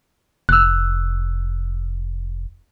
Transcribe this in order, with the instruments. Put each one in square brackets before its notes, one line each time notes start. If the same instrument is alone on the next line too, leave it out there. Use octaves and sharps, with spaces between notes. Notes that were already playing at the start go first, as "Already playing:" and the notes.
[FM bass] F1 [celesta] E6 F#6